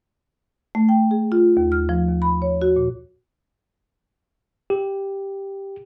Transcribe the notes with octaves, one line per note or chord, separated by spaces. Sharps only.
A3
G5
G#4
F4
D#2
F6
F3
D#2
B5
C#5
F#4
A#2
G4